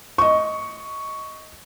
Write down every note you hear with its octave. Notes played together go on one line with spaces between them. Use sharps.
D#5 C#6